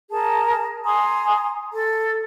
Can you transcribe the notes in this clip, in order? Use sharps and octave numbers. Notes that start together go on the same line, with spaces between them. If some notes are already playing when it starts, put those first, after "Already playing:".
G#4 A#4 A5
G#5 A#5 C6 D#6
A4